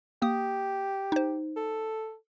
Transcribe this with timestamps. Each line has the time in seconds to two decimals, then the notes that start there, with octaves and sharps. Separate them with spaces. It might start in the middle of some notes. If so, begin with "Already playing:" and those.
0.22 A#3 G4 D#6
1.12 D#4 C5
1.57 A4